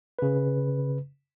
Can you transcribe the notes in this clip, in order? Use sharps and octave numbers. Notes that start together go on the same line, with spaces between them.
C#3 B4